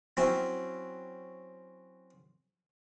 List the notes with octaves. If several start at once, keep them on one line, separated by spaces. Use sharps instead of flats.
F#3 C4 C#4 E4